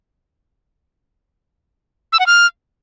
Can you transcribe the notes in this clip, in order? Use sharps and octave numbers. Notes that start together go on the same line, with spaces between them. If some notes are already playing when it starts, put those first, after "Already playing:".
E6
F#5
F6